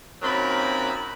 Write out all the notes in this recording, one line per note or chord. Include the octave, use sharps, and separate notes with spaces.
F#2 A#2 D#3 F#3 C4 B5